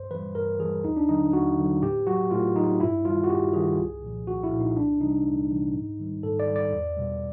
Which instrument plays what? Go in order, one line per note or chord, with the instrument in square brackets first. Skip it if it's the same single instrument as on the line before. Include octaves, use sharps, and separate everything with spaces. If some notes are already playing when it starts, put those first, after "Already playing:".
Already playing: [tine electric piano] G2 C5
E3 G3 B4
G2 A#4
E3 G3 G#4
D#2 D#4
D4
D3 F#3 D#4
D#2 F#4
D3 F#3
A2 G4
F#3 F#4
A2 F4
F#3 D#4
G2 E4
D#3 G3 F4
F#4
G2 G4
D#3 G3 G#4
C2
A#2 F3
C2 F#4
E4
A#2 F3
D#4
C2 D4
C3 E3 G3 D#4
C2
C3 E3 G3
G#2
D#3 G3
G#2 A4
D5
D#3 G3
D5
E2
B2 G3